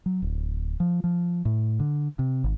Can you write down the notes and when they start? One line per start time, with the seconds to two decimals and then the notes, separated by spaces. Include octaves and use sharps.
0.06 F#3
0.22 D1
0.80 F3
1.04 F3
1.45 A2
1.79 D3
2.19 C3
2.44 G#1